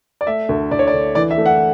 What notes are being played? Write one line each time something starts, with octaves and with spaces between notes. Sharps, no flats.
D5
A3 E5
D2
D2 D5
C#5
D5
D3
E3 D5
E5
A3
F#5